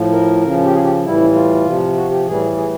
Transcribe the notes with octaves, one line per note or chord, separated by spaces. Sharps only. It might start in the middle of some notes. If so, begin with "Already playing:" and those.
Already playing: A2 F3
A#4
C#3 F3
G4
G#4
G4
A2 E3 G3 E4
F4
C3 F3
F#4
G4
A2 E3 G3 G#4
G#4